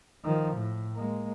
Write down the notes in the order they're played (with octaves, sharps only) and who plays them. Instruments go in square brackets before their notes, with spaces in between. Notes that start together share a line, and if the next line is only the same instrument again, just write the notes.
[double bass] D#3 F3
A2
G#3 A#3